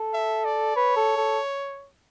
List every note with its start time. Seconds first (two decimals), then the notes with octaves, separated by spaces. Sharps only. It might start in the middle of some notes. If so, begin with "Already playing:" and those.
Already playing: A4
0.13 E5
0.45 D5
0.76 B4 C#5
0.96 A4
1.17 A4